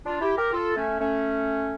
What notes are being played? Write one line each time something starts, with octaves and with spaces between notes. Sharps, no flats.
D4 F4
E4 G4
G4 A#4
F4 A4
A3 C#4
A3 C#4